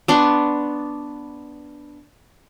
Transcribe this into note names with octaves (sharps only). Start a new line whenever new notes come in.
B3 D4 C6 C#6